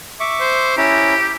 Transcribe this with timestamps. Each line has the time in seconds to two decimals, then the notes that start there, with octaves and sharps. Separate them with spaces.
0.20 E5 C#6 D6
0.40 C5
0.77 C#4 E4 G4 A#5